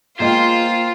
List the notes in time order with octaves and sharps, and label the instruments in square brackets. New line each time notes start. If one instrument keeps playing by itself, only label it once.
[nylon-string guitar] G#3 B3 D#5 [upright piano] A#3 G5 [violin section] F4 [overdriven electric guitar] C5